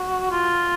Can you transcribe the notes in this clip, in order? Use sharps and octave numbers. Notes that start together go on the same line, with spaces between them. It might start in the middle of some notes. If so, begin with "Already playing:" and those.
Already playing: F#4
F4